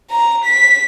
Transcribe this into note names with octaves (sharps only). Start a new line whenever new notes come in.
A#5
B6